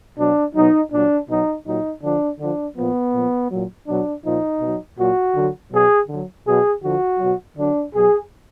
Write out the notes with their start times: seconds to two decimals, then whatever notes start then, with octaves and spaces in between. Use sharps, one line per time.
0.17 B2 F#3 D4
0.54 B2 F#3 D#4
0.91 A#2 F#3 D4
1.28 B2 F#3 D#4
1.65 A#2 F#3 D#4
2.02 D3 F3 D4
2.38 D3 F3 D4
2.76 A#2 F3 B3
3.13 A#2 F3
3.50 A#2 F#3
3.86 B2 F#3 D4
4.24 A#2 F3 D#4
4.61 B2 F#3
4.97 A#2 F#3 F#4
5.34 D3 F#3
5.71 B2 F#3 G#4
6.08 D3 F#3
6.45 B2 F#3 G#4
6.82 D3 F3 F#4
7.19 B2 F#3
7.56 D3 F#3 D4
7.92 B2 F#3 G#4